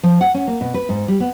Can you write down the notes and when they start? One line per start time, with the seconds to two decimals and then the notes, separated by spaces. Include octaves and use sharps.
0.03 F3
0.21 F#5
0.34 C#4
0.47 A#3
0.61 B2
0.74 B4
0.89 G#2
1.08 G3
1.20 B3